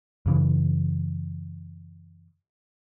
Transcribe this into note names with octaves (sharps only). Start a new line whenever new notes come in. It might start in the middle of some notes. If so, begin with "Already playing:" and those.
F#2 C#3 E3